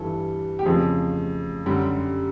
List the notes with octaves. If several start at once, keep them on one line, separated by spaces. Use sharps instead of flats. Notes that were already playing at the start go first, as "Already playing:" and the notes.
Already playing: G2 E3 G3 A4
G4
F2 C#3 F3 G#4
F#2 D3 G3